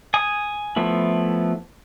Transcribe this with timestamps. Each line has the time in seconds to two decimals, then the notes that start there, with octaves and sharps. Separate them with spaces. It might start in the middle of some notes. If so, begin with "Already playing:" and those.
0.14 G#5 D#6
0.76 F3 A3 B3 E4